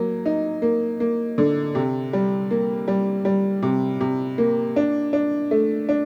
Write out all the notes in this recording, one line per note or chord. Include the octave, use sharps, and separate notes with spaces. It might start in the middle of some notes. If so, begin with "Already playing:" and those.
Already playing: F#3 A#3
D#4
A#3
A#3
D3
C3
G3
A#3
G3
G3
C3
C3
A#3
D4
D4
A3
D4